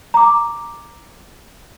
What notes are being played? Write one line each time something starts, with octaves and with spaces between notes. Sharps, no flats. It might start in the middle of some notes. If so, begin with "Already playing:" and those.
A#5 D6